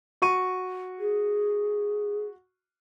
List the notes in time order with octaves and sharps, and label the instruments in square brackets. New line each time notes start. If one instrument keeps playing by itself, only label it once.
[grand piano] F#4 C#6 D#7
[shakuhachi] G#4